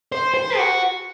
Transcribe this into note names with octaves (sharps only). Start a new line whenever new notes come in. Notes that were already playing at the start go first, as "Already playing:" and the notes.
C5
C5
F#4